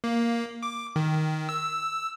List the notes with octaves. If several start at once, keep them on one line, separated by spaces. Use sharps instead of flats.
A#3
D6
D#3
E6